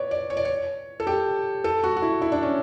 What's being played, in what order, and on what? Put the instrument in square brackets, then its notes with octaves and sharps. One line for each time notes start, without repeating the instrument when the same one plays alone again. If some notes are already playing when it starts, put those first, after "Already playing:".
Already playing: [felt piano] B4 C#5 D5
D5
C#5
D5
C#5
A4
G4
A4
F#4
F#4
E4
E4
D4
C#4